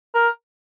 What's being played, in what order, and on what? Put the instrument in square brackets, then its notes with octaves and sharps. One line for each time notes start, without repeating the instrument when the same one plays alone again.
[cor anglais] A#4